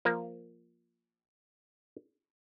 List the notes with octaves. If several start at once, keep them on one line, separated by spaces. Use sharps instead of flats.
F3 A#3